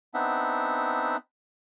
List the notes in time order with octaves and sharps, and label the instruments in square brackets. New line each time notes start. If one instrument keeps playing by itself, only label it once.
[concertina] B3 C4 D4 D#4 E5 F#5